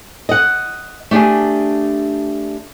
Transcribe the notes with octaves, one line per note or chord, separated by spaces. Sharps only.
D#5 F#5
A3 D4 G4 G#4